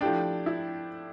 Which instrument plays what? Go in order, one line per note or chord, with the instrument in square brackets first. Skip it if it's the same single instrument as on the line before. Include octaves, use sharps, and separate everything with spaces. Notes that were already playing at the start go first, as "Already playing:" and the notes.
[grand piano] F3 A3 E4 G4 [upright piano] D4
[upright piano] E4